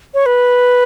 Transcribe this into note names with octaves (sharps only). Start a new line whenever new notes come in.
C#5
B4